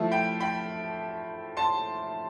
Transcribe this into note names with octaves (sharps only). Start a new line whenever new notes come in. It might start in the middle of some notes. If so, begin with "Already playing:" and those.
Already playing: F3 A3 E4
G5 B5
G5 B5
A5 C6